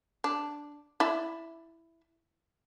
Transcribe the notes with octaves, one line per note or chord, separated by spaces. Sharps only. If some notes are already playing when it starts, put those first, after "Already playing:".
D4
E4 D5 E5